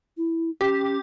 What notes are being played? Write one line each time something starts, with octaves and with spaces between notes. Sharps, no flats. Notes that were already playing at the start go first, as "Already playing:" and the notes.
E4
C#4 G4